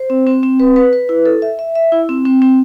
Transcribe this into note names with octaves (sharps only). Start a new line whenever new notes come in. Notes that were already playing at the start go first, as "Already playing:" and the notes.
Already playing: C5
C4
C4
C4
B4
B4
B4
E4
A4
E5
E5
E5
E4
C4
C4
C4